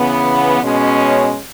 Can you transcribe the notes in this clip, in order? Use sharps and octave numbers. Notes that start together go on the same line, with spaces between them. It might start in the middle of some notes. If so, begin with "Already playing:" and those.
Already playing: C#3 E3 B3
B2 G#3 C#4